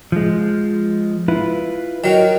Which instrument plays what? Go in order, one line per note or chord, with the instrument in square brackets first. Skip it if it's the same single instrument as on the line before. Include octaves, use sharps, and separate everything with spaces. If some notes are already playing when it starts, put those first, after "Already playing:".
[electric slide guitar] F3 G#3
E4 F4 B4
[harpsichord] D#3 F#3 [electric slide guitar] A#4 D#5